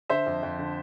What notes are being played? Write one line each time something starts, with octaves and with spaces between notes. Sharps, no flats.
D3 C5 E5
F2
F2
D3